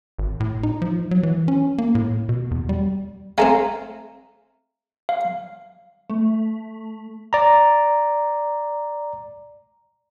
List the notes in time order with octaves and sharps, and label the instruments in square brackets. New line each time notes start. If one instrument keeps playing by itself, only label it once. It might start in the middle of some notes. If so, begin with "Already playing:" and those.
[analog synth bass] G#1
A2
D#4
F3
F#3
E3
C#4
A#3
A2
B2
E2
G3
[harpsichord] G#3 A3 C4 [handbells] F5 G#5 A#5
[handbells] F5
[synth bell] A3
[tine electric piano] D5 A#5